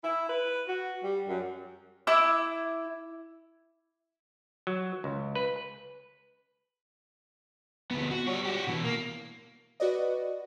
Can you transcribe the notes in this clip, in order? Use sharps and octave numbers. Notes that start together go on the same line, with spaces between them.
E4
B4
F#4
G3
F#2
E4 D6 E6
F#3
C#2
B4
D2 B3
F#4
G3 C#5
F#4 G4
B2 E3
A#3
F#4 B4 D5 D#5